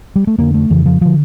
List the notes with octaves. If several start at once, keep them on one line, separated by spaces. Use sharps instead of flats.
G3
A3
F2 D3 A#3
A3
F2 C#3 E3
F3
D3 F3